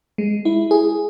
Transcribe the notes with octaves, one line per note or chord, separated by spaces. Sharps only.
G#3
E4
G#4